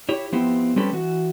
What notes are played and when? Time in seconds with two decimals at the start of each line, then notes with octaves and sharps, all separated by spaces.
0.09 E4 G4 C#5
0.32 F3 B3 C4 E4 G4
0.76 G3 C4 C#4 A4 B4
0.93 E3 F#4